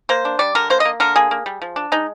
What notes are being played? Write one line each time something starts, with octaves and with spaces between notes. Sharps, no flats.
A#3 C5
D4
G3 D5
D3 A#4
A#3 C5
D#5
A#3
D3 A#4
A#3 G#4
A#3
G3
F3
D4
G#3 D#4